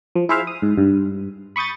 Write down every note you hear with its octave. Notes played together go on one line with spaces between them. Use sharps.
F3
E4 G#4 C5 E5 F5
D#6
G#2
G2
B5 C#6 D#6 G6 A6